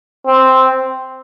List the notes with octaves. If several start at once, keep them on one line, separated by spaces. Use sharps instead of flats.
C4